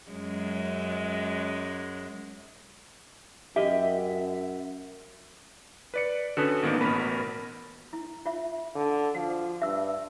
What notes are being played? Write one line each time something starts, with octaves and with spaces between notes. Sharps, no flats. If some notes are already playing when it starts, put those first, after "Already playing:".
F#2 G#3
F#2 G4 D#5 E5
B4 D5 C#7
D3 C#4 F#4 B4 A5 D#6
G#1 D#3 A#3 B3
A1 B2 B3 A#4 B5
E4
F4 E5
D3
F3 F#4
G2 E5 E6